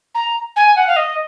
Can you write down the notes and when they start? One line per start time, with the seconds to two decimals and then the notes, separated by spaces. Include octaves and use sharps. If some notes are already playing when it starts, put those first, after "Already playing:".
0.15 A#5
0.56 G#5
0.76 F#5
0.87 F5
0.96 D#5